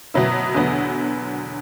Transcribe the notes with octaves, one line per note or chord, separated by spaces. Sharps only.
B2 F#3 B3 E4
E2 D3 F#3 B3